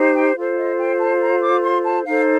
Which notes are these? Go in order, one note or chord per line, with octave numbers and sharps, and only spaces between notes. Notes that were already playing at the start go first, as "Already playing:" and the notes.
Already playing: D#4 G4 C5
G5
F4 A4 C5
D#5
G5
A5
A#5
D6
C6
A5
D#4 A4 C5 F5